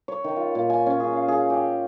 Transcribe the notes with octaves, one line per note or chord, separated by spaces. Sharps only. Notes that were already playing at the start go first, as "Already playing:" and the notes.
C#5
D#3
F4
A#2
G#5
C#4
G#4
F5
G#4
G4